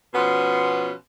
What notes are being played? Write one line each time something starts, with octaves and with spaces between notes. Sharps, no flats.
B2 F3 B3 C#4 C6